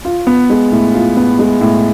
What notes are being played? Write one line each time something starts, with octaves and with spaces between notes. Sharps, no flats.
F4
B3
G#3
A2
F4
B3
G#3
A2